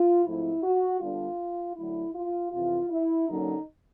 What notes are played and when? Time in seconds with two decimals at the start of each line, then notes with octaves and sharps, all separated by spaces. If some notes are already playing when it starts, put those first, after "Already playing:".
Already playing: F4
0.25 G#2 F3 A3 C4 E4
0.63 F#4
1.01 D3 G3 B3 D4 F4
1.76 D3 F#3 A3 E4
2.14 F4
2.52 F2 C3 E3 F4
2.90 E4
3.28 D3 F#3 A#3 C#4 D#4